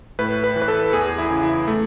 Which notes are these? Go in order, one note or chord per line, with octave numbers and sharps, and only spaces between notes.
A2 B4
B4
E3
B4
A4
E2 G#4
E4
C#3 E3
E4
A3